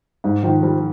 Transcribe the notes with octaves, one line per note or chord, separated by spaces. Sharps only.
G#2 G3
D#3 F3
F3 G3